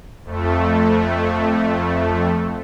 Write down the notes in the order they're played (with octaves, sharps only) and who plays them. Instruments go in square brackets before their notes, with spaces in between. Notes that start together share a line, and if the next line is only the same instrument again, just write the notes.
[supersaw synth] F2 A3